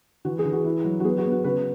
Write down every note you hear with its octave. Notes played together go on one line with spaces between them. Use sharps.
E3 F#4
G#4
E3
F#4
E4
F#3
F#4
B3 G#4
F#4
B3
F#4
C#3 F#4 B4